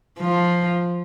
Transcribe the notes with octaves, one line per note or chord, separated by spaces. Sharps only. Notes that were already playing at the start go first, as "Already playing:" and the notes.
F3